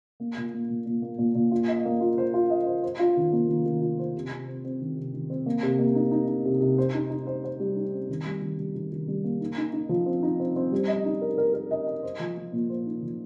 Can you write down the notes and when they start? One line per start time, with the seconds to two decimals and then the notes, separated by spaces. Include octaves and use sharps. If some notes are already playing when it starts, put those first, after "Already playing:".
0.20 A#3
0.37 A#2
0.54 A#3
0.69 A#2
0.86 A#2
1.02 A#3
1.18 A#2
1.35 A#2
1.51 F4
1.68 D#5
1.85 A#3
2.00 F4
2.18 C5
2.34 F4
2.50 D#5
2.67 C5
2.83 C5
2.99 F4
3.17 D#3
3.32 A#3
3.49 D#3
3.66 D#3
3.81 F4
3.99 C5
4.15 C3
4.31 C3
4.48 C4
4.65 C4
4.81 D#3
4.96 C3
5.13 D#3
5.30 C4
5.46 A#3
5.63 C3
5.79 A#3
5.95 D#4
6.11 D#4
6.28 D#4
6.45 C3
6.61 C3
6.78 C5
6.94 D#4
7.10 D#4
7.27 C5
7.44 C5
7.60 G3
7.76 D#4
7.93 C4
8.09 D#3
8.25 G3
8.41 D#3
8.59 G3
8.75 D#3
8.92 D#3
9.08 G3
9.24 A#3
9.41 D#4
9.57 D#4
9.73 D#4
9.89 F3
10.06 C4
10.23 D#4
10.40 C4
10.56 C4
10.72 G3
10.88 D#5
11.05 D#4
11.21 A#4
11.38 A#4
11.54 A#4
11.71 D#5
11.87 D#5
12.03 C5
12.20 F3
12.37 F3
12.53 A#2
12.70 C5
12.86 D#4
13.02 F3